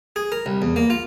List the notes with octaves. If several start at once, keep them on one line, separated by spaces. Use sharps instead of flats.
G#4
A#4
C2
E2
A#3
F4